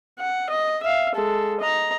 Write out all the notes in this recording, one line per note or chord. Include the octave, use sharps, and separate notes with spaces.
F#5
D#5
E5 F5
G#3 A4
D#5 A#5